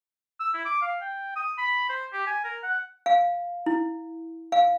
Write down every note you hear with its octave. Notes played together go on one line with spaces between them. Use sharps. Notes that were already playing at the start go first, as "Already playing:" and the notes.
E6
E4
D6
F5
G5
D#6
B5
C5
G4
G#5
A#4
F#5
F5
E4
F5